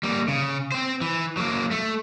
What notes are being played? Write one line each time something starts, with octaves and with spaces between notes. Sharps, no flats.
G3 A#3
C#3
C4 C5
E3
F#3 A#3
A3